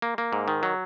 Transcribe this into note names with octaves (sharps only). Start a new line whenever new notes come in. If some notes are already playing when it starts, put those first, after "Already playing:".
A#3
A#3
G#2
D#3
F#3